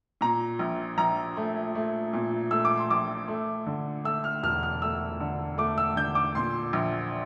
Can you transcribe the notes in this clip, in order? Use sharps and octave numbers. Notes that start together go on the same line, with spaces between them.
A#2 A#5
A#1
A#1 A#5
A3
A3
A#2
A3 E6
D6
C6
A#1 D6
A3
D3
A3 E6
F6
E1 F6
F6
A3 E6
D3
A3 D6
E6
D3 G6
D6
A#2 C6
A#1